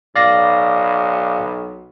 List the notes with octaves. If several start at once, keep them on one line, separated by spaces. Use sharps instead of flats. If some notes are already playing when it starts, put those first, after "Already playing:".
B1 D5 F5 A#6